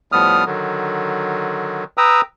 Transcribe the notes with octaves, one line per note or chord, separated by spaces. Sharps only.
A2 F3 G3 B3 D#6 F6
D3 D#3 F#3
B4 G5 A#5 D#6 E6